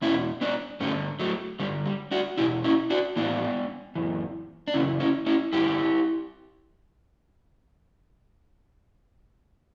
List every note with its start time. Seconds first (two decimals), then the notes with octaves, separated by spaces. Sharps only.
0.02 E2 B2 C#4 E4
0.41 B3 D4
0.80 G2 D3 A3 C#4
1.19 F#3 A3
1.59 G2 D3 G3
1.85 G3
2.11 D4 F#4
2.38 E2 B2 E4 G4
2.64 C#4 E4
2.90 D4 F#4
3.16 A2 E3 B3 D4
3.95 F#2 E3
4.68 D4
4.74 F#2 C#3 E3 C#4 E4
5.00 C#4 E4
5.26 C#4 E4
5.53 G2 D3 E4 G4